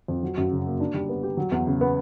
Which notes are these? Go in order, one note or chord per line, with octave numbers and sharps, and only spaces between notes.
F2
F#3
F#2
C#3
A#3
D4
G3
B3
G4
F#3
E2
C#3
B3